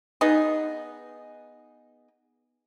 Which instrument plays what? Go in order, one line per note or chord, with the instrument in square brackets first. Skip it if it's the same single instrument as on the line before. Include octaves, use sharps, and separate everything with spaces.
[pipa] B3 D#4 G#4